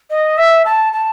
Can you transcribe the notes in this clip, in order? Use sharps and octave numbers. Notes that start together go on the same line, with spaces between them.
D#5
E5
A5
A5